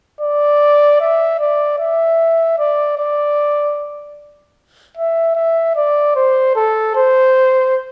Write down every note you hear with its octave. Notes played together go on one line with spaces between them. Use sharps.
D5
E5
D5
E5
D5
D5
E5
E5
D5
C5
A4
C5